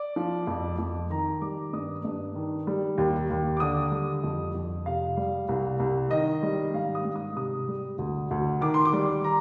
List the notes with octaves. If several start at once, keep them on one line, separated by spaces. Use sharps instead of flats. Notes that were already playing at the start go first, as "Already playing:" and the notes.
Already playing: D5
F3
F2
F2
D#3 A#5
G3 D6
G2 D#6
G2
D#3
G3
D#2
D#2
D6
D3 D#6
G3
F2
F2
C3 F5
G3
C2
C2
D#3 D#5
G3
G#2 F5
D#6
G#2
D#6
C3 D#6
G3
D2
D2
D#3 D6
C6
D6
G3
A#5